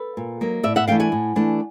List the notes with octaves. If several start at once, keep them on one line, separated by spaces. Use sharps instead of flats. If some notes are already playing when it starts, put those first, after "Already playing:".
Already playing: A4 B4
A#2
F#3 A#3 D#4
A2 D5 E5
E5 F#5
E3 A3 D4 F5 G5
F#5 G#5
A2
E3 A3 D4